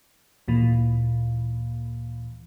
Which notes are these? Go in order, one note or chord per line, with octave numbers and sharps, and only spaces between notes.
D2 A#2 E3